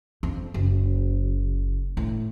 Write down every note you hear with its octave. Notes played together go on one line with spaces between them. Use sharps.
F2
F#1
A2